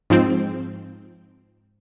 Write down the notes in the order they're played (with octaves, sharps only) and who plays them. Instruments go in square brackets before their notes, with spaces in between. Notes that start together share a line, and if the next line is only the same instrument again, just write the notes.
[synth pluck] G#2 F3 C4